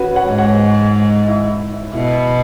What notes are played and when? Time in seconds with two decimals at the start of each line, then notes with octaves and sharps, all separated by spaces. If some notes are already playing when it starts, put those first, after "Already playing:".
Already playing: C#4 F#4 B4
0.15 C#5 F#5
0.27 G#2
0.38 C#5 F#5
1.27 E4
1.72 E4
1.94 B2 E4